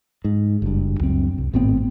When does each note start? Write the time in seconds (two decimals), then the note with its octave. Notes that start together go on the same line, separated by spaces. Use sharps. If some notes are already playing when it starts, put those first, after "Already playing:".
0.24 G#2
0.62 F#1 G2
1.00 C#2 F#2 C4
1.38 C2
1.54 G#1 A2 B3 C4